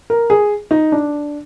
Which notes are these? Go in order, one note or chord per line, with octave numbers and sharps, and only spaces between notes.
A#4
G#4
D#4
D4